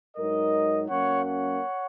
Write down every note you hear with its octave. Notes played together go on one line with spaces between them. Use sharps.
G#2 F#3 D#4 A#4 D#5
F#2 F#3 A#3 C#4 C#5 F#5
C#5 F#5